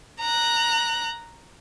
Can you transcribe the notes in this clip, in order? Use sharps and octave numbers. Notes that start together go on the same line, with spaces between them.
A#5 F#6